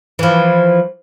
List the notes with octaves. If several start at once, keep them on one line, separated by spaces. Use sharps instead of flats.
E3 F3